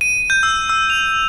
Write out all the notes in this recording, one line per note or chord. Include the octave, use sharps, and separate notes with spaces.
D#7
G6
E6
E6
F7